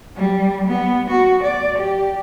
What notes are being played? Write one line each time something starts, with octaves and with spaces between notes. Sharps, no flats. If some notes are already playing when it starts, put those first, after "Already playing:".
G3
B3
F#4
D5
G4